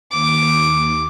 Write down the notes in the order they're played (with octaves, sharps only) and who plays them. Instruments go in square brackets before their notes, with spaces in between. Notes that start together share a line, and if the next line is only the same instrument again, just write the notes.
[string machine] D#2 [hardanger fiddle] D6